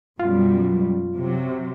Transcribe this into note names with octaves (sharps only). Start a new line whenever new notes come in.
F#2 B2 G3 F4
C3 F#3